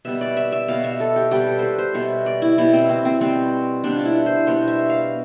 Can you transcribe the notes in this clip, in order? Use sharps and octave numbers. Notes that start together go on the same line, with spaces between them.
B2 G3 B3 E5
D5
E5
E5
B2 G3 B3 F5
E5
A4
G4
B2 G3 B3 G4
A4
B4 C5
C5
B2 G3 B3 E5
D5
E4
B2 G3 B3 E4
C4
C4
C4
B2 G3 B3 C4
B2 G3 B3 D4
F4
E4
C5
B2 G3 B3 C5
E5
F5